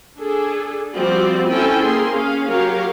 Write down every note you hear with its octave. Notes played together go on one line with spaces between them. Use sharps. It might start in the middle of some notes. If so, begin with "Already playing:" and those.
D4 G#4 A4
F3 G3 C4 F#4 D5
C4 C#4 E4 A4 G5 G#5
A#3 G#4 C6
C#4 G#4 F5
F#3 F#4 G4 A#4 C#5 F5